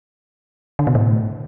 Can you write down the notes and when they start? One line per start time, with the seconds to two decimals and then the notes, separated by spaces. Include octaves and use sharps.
0.79 D3
0.87 B2
0.95 A2